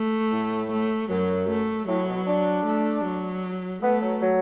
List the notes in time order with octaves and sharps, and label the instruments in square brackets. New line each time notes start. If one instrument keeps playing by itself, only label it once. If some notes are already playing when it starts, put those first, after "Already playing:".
Already playing: [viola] A3
[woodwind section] A2
[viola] A3
[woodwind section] F#2 [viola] F#3
[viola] A3
[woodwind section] A2 [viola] F#3
[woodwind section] B2
D4
[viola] A3
F#3
[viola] A3 [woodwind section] B3
[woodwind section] F#3
F#3